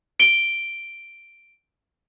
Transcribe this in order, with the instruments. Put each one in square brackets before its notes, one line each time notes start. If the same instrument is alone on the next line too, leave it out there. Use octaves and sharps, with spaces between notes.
[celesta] D7 G7